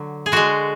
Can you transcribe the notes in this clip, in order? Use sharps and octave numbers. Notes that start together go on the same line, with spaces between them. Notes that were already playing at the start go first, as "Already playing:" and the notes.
Already playing: D3 F#3
G#4
D3 G#3 F#4